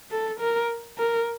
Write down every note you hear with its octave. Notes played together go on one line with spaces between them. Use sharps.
A4
A#4
A#4